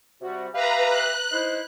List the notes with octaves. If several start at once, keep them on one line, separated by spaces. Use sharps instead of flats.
C3 G3 F#4
G4 B4 E5 F5 A#5
F#6
D#4 E4 C5